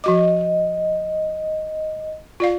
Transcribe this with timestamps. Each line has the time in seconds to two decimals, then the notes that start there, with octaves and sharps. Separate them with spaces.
0.04 F3 F#4 D#5 D6
2.40 F4 D5 F5